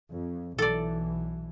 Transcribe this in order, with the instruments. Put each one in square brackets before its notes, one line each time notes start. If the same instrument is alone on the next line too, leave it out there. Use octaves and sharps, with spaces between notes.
[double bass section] F2
[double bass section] B1 E3 [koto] A4 D5